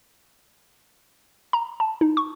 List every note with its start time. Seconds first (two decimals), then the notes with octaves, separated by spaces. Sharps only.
1.53 A#5
1.80 A5
2.01 D#4
2.17 C#6